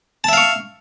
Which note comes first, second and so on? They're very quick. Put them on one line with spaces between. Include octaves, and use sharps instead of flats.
A5 E5 F5 C#6